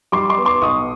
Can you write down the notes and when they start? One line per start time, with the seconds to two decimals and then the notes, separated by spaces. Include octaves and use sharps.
0.12 G3 C6 D6
0.29 C6 D6
0.38 B3
0.45 C6 D6
0.62 B1 C#6 D#6